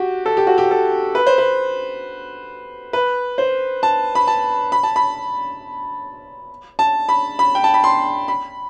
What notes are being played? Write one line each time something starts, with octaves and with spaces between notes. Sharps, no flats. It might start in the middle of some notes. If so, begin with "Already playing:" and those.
Already playing: F#4 G4
A4
G4
F#4
G4
A4
B4
C5
B4
B4
C5
A5
B5
A5
B5
A5
B5
A5
B5
B5
G5
A5
B5
C6
B5